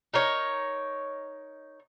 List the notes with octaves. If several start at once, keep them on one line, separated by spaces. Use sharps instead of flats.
D#4 A#4 C#5